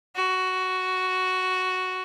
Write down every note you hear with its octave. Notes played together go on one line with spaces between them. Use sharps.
F#4